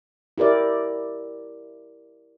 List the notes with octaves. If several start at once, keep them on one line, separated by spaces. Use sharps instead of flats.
E4 G4 A#4 D5